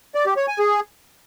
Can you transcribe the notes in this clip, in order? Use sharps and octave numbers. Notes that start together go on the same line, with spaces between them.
D5
G4
C#5
G#5
G#4